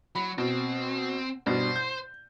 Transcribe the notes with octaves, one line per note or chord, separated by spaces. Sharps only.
F#3 B5
B2 C4
G2 B2 C5
G6